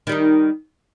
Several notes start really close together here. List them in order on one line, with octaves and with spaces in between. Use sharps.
D#3 G3 D#4